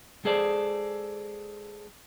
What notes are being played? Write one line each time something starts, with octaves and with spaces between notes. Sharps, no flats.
G#3 G#4 A4 C5 D5